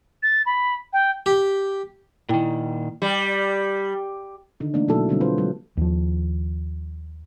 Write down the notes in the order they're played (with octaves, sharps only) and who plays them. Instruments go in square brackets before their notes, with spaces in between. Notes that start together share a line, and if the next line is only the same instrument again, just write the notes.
[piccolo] A6
B5
G5
[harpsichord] G4
[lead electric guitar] A#2 D#3 [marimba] E4 G5
[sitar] G3
[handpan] D3 D#3 D#4
E3 A3 A#3 D4
B2 F#3 A#3 E4 A4
D3 G3 C4
F4 B4 C5
F#3 G#3
[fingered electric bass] D#2 F3